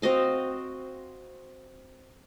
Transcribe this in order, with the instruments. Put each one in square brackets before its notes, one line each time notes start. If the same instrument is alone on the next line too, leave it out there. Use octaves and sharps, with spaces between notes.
[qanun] C4 F#4 D#5 F5